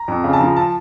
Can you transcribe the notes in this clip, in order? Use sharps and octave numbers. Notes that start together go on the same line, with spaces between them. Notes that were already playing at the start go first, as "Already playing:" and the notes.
Already playing: A#5
F2
C#3
A5
F3 A#5
A5